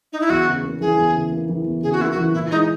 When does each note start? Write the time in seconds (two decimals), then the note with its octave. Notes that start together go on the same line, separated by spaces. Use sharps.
0.13 D#4
0.21 E4
0.30 E2 F#4
0.47 C#3
0.63 A#3
0.81 E3 G#4
0.98 E2
1.15 C#3
1.32 A#3
1.49 E3
1.66 E2
1.83 C#3 G#4
1.92 F#4
2.00 A#3 E4
2.11 F#4
2.17 E3
2.34 A#2 E4
2.51 G#3 D#4